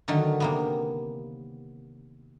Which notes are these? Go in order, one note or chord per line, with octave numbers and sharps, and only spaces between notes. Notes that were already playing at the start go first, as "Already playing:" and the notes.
D3 D#3 F#3 A3
C3 A#3 B3